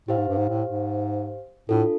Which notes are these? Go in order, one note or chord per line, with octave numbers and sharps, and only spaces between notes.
A2 G4 C5 F5
G#2
G2
G#2
A2
G#2
A2 D4 F4 A4